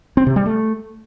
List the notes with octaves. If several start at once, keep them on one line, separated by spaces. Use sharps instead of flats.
C4
C3
G3
A3